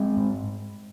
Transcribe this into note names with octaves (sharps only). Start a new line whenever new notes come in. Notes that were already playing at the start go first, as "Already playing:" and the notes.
Already playing: G#3 C4
G#2